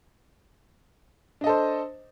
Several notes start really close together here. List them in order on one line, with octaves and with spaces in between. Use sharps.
D4 D#5 A4 C5